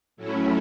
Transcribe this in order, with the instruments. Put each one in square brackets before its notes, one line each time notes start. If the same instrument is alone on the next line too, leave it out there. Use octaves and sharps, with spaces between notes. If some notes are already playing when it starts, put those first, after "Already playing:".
[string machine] A2 F#3 A3 C#4 E4